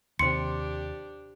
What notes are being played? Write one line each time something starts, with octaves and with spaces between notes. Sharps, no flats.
D#2 C3 D4 G4 C5 G5 C6 C#7